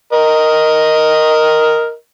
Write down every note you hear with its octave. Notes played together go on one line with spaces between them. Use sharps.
A#4 D#5